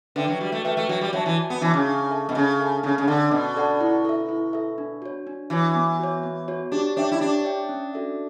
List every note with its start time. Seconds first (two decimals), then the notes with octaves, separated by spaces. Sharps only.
0.16 D3 B4 E5 G5
0.28 F#3
0.40 G3 F#4
0.52 A3
0.65 A3 B4 E5 G5
0.77 A3
0.89 F#3 F#4
1.01 G3
1.13 F#3 C#5 E5 A5
1.26 E3
1.38 F#4
1.50 B3
1.61 E3 C#5 E5 A5
1.74 C#3
1.86 D4
2.11 A4 E5 A5
2.29 B2
2.35 C#3 D4
2.59 A4 E5 A5
2.83 C#3 D4
2.98 C#3
3.08 D3 A4 D5 F#5 A5
3.31 B2 D4
3.56 A4 D5 F#5 A5
3.81 E4
4.05 A4 E5
4.29 E4
4.53 A4 E5
4.78 D4
5.02 F#4 C#5
5.27 D4
5.50 E3 F#4 C#5
5.75 B3
5.99 F#4 C#5
6.23 B3
6.48 F#4 C#5
6.72 D4 G4
6.96 D4 C#5 E5 G5
7.12 E4
7.20 D4 G4
7.45 C#5 E5 G5
7.69 C#4
7.93 F#4 A4 E5